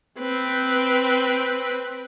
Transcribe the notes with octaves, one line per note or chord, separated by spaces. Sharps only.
C4 B4